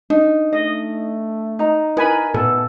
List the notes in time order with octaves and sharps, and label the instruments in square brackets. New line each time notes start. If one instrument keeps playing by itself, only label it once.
[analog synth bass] D4 [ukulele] D#4
[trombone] A3 [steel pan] D#5
[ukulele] D#4 A#5
[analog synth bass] E4 [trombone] A#4 [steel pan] B4 G#5 B5
[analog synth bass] A#2 [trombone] B3 [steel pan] A4